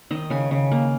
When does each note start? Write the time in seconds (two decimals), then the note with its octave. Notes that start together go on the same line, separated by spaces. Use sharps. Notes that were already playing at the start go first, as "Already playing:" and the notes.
0.11 D#3 D#5
0.30 C#3 G#5
0.51 C#3
0.71 A#3